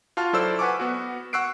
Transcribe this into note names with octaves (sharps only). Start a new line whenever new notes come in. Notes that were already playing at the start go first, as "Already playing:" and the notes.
F4 F#4 F5 A5 F6
F#3 E4 A4 C5 D5 E6
B4 F#5 G#5 C#6 D6
B3 F#4
F#5 C#6 E6 F#6 C7 D7